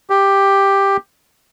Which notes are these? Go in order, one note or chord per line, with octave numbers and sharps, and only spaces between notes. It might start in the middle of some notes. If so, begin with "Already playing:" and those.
G4